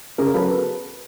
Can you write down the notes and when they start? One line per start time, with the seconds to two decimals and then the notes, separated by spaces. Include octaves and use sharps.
0.18 C#3 G#4 A#4
0.34 F#3 A4 B4